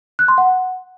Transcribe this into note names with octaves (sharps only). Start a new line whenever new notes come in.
F#6
C6
F#5